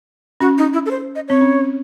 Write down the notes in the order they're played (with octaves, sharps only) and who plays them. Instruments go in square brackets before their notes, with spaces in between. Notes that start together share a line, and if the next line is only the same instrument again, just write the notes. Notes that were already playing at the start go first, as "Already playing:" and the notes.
[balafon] C#4 [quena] F#4
[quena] D#4
E4
A4
C5
D#5
[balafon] C4 [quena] C#5
[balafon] C#4